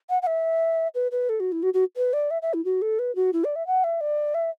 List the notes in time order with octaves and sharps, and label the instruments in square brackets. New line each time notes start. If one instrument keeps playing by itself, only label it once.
[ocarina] F#5
F#5
E5
B4
B4
A4
F#4
E4
F#4
F#4
B4
D5
E5
E5
E4
F#4
A4
B4
F#4
E4
D5
E5
F#5
E5
D5
E5